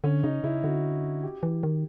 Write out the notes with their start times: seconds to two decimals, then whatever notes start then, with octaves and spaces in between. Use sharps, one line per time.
0.04 D3 C#4
0.23 C#3 D#4
0.44 C#3 E4
0.63 D3 F#4
1.23 G4
1.43 E3
1.63 D#3